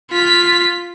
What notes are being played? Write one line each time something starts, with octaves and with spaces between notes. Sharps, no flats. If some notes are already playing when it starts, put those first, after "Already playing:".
F4 B6